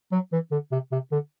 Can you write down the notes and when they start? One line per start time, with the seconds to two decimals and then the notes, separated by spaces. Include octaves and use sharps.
0.12 F#3
0.32 E3
0.51 D3
0.72 C3
0.92 C3
1.12 D3